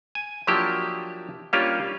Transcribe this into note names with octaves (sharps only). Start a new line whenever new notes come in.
G#5
F3 F#3 A#3 D4 E4 G4
G3 A#3 C#4 D4 F4 G4